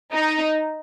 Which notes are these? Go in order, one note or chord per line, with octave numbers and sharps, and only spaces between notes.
D#4